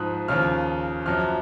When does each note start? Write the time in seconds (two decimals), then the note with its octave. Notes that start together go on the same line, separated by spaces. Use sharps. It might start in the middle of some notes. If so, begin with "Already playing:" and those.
Already playing: G#2 F3 D#6 F#6
0.28 D#2 C#3 F3 F6
1.06 F#2 F3 F6